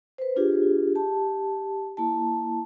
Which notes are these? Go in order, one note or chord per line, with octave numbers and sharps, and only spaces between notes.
B4 C5
D4 F4 G4 G#4
G4 A5
A#3 E4 A5